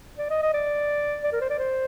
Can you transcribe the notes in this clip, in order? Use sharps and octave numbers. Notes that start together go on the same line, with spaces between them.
D5
D#5
D#5
D5
D5
A#4
C5
D5
C5